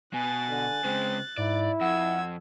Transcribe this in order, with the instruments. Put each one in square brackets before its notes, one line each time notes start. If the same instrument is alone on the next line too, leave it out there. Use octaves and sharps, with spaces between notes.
[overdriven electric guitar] B2 [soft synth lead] G#5 [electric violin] F#6 A6
[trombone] D3
[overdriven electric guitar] C#3 G#3 [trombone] C4
[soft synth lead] G#2 [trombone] E4 [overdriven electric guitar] D5
[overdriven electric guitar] F2 [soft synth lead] F#5 [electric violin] E6 G#6